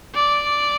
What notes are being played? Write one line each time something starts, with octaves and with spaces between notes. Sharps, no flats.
D5